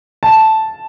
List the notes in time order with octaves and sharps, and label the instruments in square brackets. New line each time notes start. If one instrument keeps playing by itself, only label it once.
[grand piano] A5